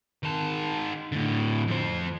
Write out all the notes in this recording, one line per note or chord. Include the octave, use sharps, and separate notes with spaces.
D#3 A5
A2 D3
F2 C5